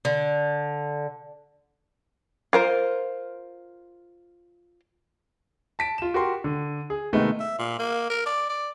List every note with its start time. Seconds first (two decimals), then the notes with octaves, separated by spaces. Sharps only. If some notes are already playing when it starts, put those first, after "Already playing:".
0.05 D3
2.53 F4 A#4 C5
5.79 A5 B6 D7
5.98 F4 E7
6.14 F#4 G4 A#4 C6
6.44 D3
6.90 G#4
7.13 C3 D#3 G#3 A3 B3
7.40 E5
7.58 A#2
7.79 A#3
8.10 A#4
8.26 D5
8.49 D5